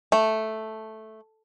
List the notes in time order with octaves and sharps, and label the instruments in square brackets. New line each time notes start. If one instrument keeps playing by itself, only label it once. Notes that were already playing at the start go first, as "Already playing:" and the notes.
[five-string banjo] A3